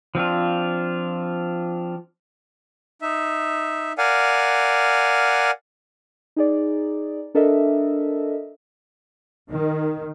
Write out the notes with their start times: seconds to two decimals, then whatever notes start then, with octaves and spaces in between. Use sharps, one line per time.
0.15 F3 C4 D4 F4
3.02 D#4 E5
3.98 A#4 D5 F5 F#5 G#5
6.36 D#4 G#4 D5
7.35 D4 A4 A#4 D#5 E5
9.48 D#3